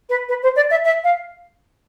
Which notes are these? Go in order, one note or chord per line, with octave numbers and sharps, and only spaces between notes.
B4
B4
C5
D5
E5
E5
F5